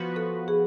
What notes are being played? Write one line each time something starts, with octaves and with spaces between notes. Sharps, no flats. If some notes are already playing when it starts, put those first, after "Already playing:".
Already playing: F3 B3 F#4 B4
A4
G#4